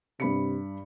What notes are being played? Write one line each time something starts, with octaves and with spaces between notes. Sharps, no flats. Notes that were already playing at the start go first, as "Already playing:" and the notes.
G2 C3 B5 C#7